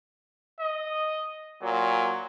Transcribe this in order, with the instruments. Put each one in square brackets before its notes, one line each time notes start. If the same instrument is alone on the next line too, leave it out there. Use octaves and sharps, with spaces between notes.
[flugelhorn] D#5
[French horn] A#2 [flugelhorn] F#3